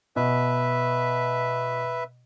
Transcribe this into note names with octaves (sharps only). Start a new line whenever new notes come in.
B2 B4 E5